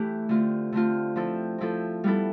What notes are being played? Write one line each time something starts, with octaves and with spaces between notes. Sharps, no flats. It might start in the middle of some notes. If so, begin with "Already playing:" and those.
Already playing: E3 A3 E4 G4
D3 A3 C4 F4
D3 A3 C4 F4
F3 C4 E4 A4
F3 C4 E4 A4
G3 B3 E4 A4